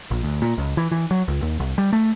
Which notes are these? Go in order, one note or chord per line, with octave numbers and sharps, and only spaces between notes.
A#1
D2
A#2
C#2
E3
E3
F#3
C#2
D#2
C2
G3
A3